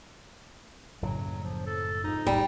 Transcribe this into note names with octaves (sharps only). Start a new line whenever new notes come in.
F#1 A2 C#3 F#3
F3
A4
F2 G#2 D#4
D1 B1 G3